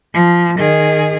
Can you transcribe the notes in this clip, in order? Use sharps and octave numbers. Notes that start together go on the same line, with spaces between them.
F3
D#3 G#4